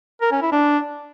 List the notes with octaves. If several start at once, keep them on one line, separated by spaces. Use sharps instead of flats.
A#4
C#4
E4
D4